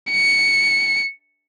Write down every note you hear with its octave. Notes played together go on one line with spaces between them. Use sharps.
C#7